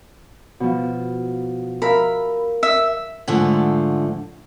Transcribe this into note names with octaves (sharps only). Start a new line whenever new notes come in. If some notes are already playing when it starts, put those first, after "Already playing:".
B2 F3
A#4 E5 F5 B5
E5
G#2 D3 F3 A3